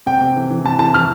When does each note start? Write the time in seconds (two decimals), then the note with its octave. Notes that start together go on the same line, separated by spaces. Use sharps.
0.06 C3 G5
0.21 C3
0.36 E3
0.50 E3
0.64 C3 A5
0.79 E3 A5
0.94 E3 F6